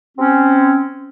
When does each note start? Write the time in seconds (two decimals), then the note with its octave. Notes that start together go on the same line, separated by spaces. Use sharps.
0.18 C4 C#4